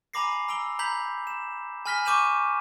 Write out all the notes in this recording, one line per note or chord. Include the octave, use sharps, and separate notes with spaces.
G#5 A#5 B5 D6 A#6 C7
A#5 E6 D7 F7 G7
A#5 B5 G6 B6 F#7
E7
G#5 B5 F6 A#6 B6 G7
C#6 D6 G6 D#7 E7 F#7